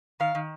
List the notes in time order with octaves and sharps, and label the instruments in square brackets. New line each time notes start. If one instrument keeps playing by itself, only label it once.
[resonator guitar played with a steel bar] D#3 F5
D#3